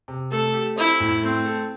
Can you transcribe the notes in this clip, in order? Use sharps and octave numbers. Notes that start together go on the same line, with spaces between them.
C3
A3 A4
G4
C4 E4
A2
A3 C4
A4